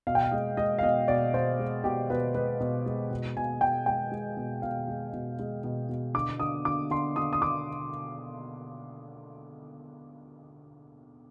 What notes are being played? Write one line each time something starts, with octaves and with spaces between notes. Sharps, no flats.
B2 F5
G5
F5
G#3 D#5
G#3 D#5
F5
B2 D#5
B2 D5
B2 C5
G#3
B2 G4
B2 B4
G#3 B4
B2
G#3
B2
B2 G#5
B2 G5
G#3 G5
G#3
B2
B2 F5
G#3
B2
G#3
B2
B2
D3 D6
D3 D#6
D3 D6
D3 C6
D3 D#6
D#6
D3 D6